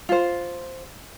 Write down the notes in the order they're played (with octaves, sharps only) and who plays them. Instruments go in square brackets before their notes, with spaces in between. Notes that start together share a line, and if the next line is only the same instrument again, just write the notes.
[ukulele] F4 C5